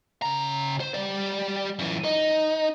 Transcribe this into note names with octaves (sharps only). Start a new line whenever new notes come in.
C#3 A#5
C5
G3 D5
F#2 E3
D#4